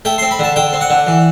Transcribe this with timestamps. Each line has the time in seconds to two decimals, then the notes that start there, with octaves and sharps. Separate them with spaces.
0.05 A3 G5
0.18 C6
0.22 C4
0.31 B5
0.39 D3 A5
0.56 D3 G5
0.73 C4
0.81 F#5
0.90 D3
1.07 E3